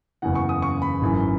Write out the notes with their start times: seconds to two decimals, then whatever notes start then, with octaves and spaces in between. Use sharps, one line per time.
0.22 F#1 E2 C#3 E3 F#5
0.35 C#6
0.49 D#6
0.62 C#6
0.82 B5
1.01 G#1 F#2 E3